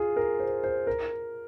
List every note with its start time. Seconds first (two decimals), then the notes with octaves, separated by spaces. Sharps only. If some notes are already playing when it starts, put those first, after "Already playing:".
Already playing: F4 G#4
0.16 A#4
0.40 C5
0.64 C5
0.87 A#4